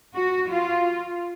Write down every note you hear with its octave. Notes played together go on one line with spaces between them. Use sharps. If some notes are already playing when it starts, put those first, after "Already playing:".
F#4
F4